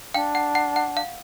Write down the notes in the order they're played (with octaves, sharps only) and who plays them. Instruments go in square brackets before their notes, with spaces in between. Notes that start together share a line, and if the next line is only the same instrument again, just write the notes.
[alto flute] D4 [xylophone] F5 G5
[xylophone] F#5
F#5
F#5
F5